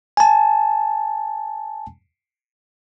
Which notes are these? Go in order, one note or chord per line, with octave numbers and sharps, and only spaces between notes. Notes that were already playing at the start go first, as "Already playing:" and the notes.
G#5 A5